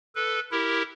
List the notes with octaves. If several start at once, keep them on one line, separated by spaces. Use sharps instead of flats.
A4 B4
E4 G4 A#4